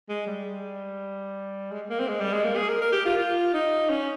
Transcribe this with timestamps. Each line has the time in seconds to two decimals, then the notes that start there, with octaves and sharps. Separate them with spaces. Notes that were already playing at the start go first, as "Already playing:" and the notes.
0.09 G#3
0.27 G3
1.71 G#3
1.90 A#3
2.00 C4
2.08 G#3
2.21 G3
2.33 G#3
2.44 A#3
2.56 G#4
2.69 A#4
2.81 A#4
2.92 G4
3.05 F4
3.17 F4
3.54 D#4
3.90 C#4